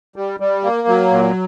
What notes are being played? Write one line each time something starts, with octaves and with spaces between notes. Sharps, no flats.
G3
G3
A#3
F#3
A#2